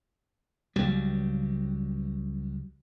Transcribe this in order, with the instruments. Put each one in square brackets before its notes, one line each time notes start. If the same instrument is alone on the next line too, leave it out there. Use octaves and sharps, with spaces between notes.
[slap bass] C#2 F#3 G3